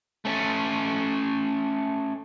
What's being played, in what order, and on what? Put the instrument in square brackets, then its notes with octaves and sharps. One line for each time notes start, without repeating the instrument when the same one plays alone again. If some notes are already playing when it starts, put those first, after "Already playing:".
[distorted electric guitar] A3 C#4